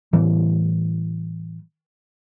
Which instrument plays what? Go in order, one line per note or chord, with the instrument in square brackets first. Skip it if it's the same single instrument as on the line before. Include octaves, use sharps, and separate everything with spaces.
[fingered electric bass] A2 E3 G3